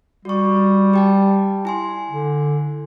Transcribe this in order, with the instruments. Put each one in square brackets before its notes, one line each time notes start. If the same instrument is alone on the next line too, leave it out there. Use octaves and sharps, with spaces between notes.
[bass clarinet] G3 [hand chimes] F#4 C#6
[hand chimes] G4 G5 A5
E4 G#5 C6
[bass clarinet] D3